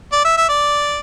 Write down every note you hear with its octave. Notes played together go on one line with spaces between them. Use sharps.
D5
E5
E5
D5